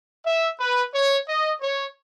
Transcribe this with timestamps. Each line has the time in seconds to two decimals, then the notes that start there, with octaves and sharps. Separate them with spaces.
0.25 E5
0.60 B4
0.94 C#5
1.28 D#5
1.62 C#5